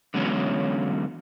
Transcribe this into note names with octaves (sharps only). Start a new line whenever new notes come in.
D3 E3 F#3 G#3 B3 C#4